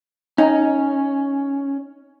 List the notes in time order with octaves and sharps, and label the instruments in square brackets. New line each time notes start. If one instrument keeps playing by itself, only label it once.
[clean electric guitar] C#4 [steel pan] D#4